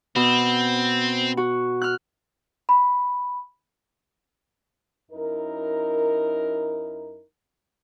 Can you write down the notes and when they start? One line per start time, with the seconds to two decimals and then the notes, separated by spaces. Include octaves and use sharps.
0.16 B2 C4
1.37 F#4
1.82 F6 F#6
2.69 B5
5.11 F#2 D#4 E4 A#4